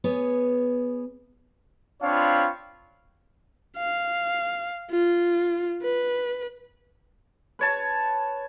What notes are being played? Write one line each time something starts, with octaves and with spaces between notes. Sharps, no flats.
B3 G#4 C#5
C4 D4 F4 C#5 F5 B5
F5
F4
B4
B4 C#5 A5